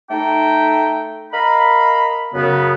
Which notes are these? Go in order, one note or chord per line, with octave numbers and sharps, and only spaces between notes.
A3 D#4 G5
A#4 D#5 F5 B5
F#2 C#3 B3